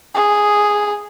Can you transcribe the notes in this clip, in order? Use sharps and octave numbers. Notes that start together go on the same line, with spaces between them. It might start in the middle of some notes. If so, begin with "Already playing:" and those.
G#4